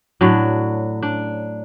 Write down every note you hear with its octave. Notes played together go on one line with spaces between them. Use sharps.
A2 F#3 D4
D4